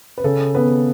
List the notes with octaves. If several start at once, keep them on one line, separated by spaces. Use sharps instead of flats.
B4
C#3 A4
B3 B4